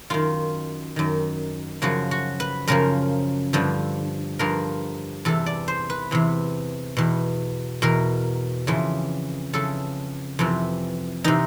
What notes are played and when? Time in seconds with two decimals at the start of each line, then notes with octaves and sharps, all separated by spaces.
0.10 F#2 D#3 F4
0.96 F#2 D#3
1.82 F#2 C#3 F3 F#4
2.11 F#4
2.40 B4
2.68 F#2 C#3 F3 A#4
3.53 G2 D3 F3
4.39 G2 D3 F3 A#4
5.25 E2 C3 E3 A4
5.46 D5
5.68 C5
5.90 B4
6.11 E2 C3 E3
6.97 E2 B2
7.82 E2 B2 A#4
8.67 F2 C#3 E3
9.53 F2 C#3 E3 A4
10.39 F2 C3 E3
11.24 C3 E3 D#4